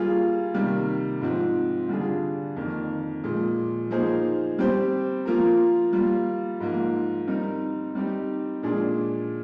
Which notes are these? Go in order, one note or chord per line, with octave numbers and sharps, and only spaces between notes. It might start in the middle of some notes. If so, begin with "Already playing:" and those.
Already playing: G3 A#3 F4 G#4
C3 D#3 G3 A#3
G#2 F3 C4
D3 G3 D4 F4 G#4
F2 D#3 A#3
A#2 F3 G#3
F3 A#3 D#4 G#4 C5
G3 C4 G4 C5
F3 A#3 F4 A#4
G3 A#3 F4
G#2 F3 A#3
G3 C4 D#4 A#4
G3 C4 D#4 G4
A#2 F3 G#3 D4 G#4